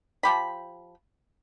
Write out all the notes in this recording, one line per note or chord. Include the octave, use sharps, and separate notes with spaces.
F3 G4 B5